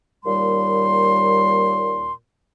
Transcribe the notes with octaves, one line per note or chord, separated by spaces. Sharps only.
D#2 A#2 G3 C6